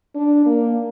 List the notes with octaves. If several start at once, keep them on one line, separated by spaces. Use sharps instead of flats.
D4
A#3